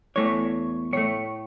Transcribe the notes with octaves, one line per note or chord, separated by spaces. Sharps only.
E2 E3 A3 C#5
A2 A3 C#5